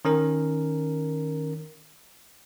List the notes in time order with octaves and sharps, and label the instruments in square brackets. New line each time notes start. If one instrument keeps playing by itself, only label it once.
[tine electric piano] D#3 C#4 A#4